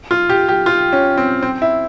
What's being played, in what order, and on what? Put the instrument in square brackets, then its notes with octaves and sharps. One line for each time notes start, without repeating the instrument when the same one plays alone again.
[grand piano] F4
G4
G4
F4
C#4
C4
C4
E4